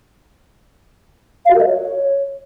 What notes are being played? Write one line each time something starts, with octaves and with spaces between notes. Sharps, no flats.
F5
F#4
A#4
D#5
C#5